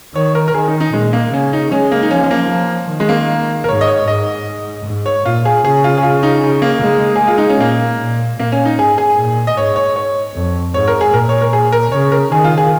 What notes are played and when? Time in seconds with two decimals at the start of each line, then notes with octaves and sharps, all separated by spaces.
0.15 D#3 C#5
0.35 A#4
0.48 A#4
0.54 D#3 G#4
0.68 D#4
0.80 D#4
0.93 A#2 G#3
1.13 A#3
1.33 C#3 C#4
1.53 D#4
1.71 G#3 C#4
1.92 A#3
2.02 D#4
2.11 F3 C#4
2.23 C#4
2.31 A#3
2.50 F3
2.89 D#3
3.00 G#3
3.09 A#3
3.64 A#4
3.68 G#2 C#5
3.81 D#5
3.87 C#5
4.07 G#2 D#5
4.85 G#2
5.06 C#5
5.25 A#2 F4
5.45 G#4
5.64 C#3 G#4
5.84 F4
5.98 G#4
6.03 F4
6.23 D#4
6.43 D#4
6.62 A#3
6.82 G#3
7.16 G#4
7.21 G#3
7.27 F4
7.38 D#4
7.50 C#4
7.60 A#2 A#3
8.00 A#2
8.39 A#2 A#3
8.52 C#4
8.65 D#4
8.78 G#2 G#4
8.98 G#4
9.17 A#2
9.47 D#5
9.57 G#2 C#5
9.76 C#5
9.96 C#5
10.34 F2
10.74 G#2 C#5
10.88 A#4
11.01 G#4
11.13 A#2 A#4
11.29 C#5
11.41 A#4
11.53 G#4
11.72 A#4
11.92 C#3 C#5
12.12 A#4
12.32 D#3 G#4
12.44 F4
12.57 G#4